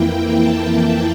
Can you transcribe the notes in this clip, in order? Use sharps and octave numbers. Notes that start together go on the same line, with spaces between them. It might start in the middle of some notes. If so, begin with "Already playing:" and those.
Already playing: F2 E3 A#3 E4 G5
A5